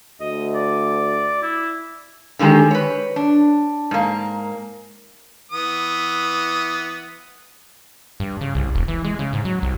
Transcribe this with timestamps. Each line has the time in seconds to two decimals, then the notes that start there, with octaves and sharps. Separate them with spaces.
0.20 D2 D#5
0.54 D5
1.42 E4
2.39 D3 D#3 G3 G#3 G4
2.71 B4 C#5
3.16 D4
3.91 G#2 A#3
5.52 E3 B3 D#6
8.20 G2
8.41 C#3
8.55 C2
8.75 E1
8.88 E3
9.04 G#3
9.19 C#3
9.33 G#2
9.45 F#3
9.62 C2